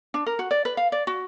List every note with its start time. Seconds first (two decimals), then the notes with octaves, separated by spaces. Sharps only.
0.14 D4
0.26 A#4
0.39 F#4
0.51 D5
0.65 B4
0.77 F5
0.92 D5
1.07 F#4